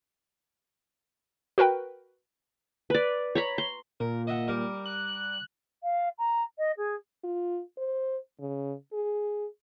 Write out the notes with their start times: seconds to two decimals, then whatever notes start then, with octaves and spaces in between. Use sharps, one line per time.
1.58 F#4 A#4 B4 G5
2.90 B4 D5
3.35 C#5 A#5 B5
3.58 C6
4.00 A#2 A#4
4.27 D#5 E5 F#5
4.48 G3 A#4
4.86 F#6
5.83 F5
6.18 A#5
6.58 D#5
6.77 G#4
7.24 F4
7.78 C5
8.40 C#3
8.93 G#4